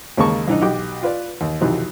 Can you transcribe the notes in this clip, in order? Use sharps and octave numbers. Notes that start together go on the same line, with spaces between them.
D#2 C#3 G#3 A#3 A5 C#6
C2 E3 D4 D#4 D#5
B1 F#4 G4 G5 D6
F4 B4 D5
D#2
B1 F2 C3 D#3 E3 F#3